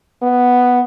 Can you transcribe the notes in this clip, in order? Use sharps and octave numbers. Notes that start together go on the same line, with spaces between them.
B3